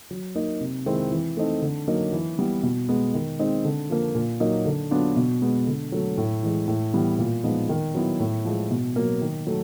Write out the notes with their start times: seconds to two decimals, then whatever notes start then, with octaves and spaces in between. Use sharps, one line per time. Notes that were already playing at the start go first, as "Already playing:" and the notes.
0.11 F#3
0.35 A#3 D#4
0.61 C3
0.86 D#3 G#3 C4 E4
1.11 E3
1.37 A3 C4 D#4
1.62 D3
1.88 F#3 A#3 D#4
2.13 E3
2.38 G3 B3 E4
2.63 B2
2.89 G#3 B3
3.14 D#3
3.39 G#3 C4 D#4
3.65 D3
3.90 F3 A#3
4.15 A#2
4.40 F#3 A#3 D#4
4.65 D3
4.91 F#3 B3 D4 F4
5.16 B2
5.42 G#3 B3
5.67 D3
5.92 F#3 A3
6.17 A2
6.43 E3 G#3
6.68 A2
6.93 E3 G3 B3
7.19 A#2
7.44 F3 G#3 B3 D#4
7.69 D#3
7.95 F#3 B3 E4
8.20 A2
8.45 F3 G#3
8.71 B2
8.96 F#3 A#3
9.21 D#3
9.47 F#3 A3